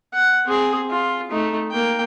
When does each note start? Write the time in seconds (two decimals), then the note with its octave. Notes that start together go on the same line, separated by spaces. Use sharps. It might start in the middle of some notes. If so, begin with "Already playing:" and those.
0.14 F#5
0.46 C4 G#4
0.90 F4
1.31 A3 D#4
1.71 A#3 G5